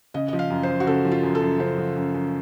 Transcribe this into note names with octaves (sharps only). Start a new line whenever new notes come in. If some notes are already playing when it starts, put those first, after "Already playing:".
C#3 D#5
F3 D#5
F5
F#2
F#2 C5
F#4
C#3 A4
F3
F4
F#2
A4
F#2
C#3 C5
F3
F#2
F#2